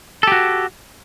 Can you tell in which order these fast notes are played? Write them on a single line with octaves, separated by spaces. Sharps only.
A4 G4 F#4